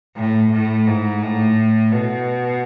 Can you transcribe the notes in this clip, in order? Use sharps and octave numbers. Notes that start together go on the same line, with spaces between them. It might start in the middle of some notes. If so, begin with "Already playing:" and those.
A2
A2
G#2
A2
B2